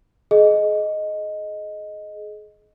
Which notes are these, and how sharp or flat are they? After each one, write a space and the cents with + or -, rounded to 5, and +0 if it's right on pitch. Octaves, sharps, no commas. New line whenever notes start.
G#4 +35 D#5 +0